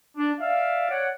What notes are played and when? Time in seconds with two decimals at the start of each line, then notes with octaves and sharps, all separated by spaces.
0.17 D4
0.40 D5 E5 F5
0.90 C#5 D5 F#5